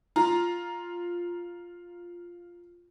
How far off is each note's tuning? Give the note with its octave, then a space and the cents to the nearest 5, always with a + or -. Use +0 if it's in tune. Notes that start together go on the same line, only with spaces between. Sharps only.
F4 +0 A#5 +5